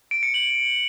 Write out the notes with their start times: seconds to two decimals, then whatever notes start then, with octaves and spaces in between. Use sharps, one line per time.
0.11 D7
0.23 C#7
0.34 F#7